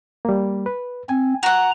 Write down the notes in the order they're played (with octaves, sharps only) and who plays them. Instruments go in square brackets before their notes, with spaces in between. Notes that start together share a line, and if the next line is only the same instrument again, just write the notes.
[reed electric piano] G3 A#3
B4
[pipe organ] C4 [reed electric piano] G#5
[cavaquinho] F#4 F#5 [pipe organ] A#5